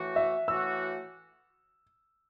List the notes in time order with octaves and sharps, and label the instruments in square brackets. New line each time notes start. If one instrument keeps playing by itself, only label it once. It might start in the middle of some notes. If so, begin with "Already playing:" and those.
Already playing: [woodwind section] A2 E3 A3 F#4
[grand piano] E5
[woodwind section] A2 E3 A3 F#4 [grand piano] E6